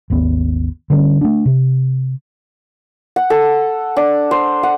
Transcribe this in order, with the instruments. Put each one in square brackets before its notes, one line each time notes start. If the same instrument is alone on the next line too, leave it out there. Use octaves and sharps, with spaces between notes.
[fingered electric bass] G#1 D#2 B3
D3 G3 C#4
A3 D4
C3
[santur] F#5
A4
D4
C5
F#5